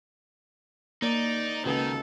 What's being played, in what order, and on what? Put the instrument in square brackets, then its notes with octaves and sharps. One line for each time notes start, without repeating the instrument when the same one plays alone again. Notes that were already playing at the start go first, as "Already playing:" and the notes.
[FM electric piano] A#3 [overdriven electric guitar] D#4 [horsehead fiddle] D5
[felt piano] C#2 F#4 B4 [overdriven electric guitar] D#3 [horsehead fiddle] A4